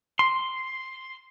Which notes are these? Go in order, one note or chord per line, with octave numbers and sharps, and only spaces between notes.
C6